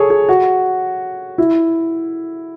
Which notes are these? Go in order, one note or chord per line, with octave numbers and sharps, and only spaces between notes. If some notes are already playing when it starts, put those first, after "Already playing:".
Already playing: G#4 A4 C#5
G#4
F#4
E4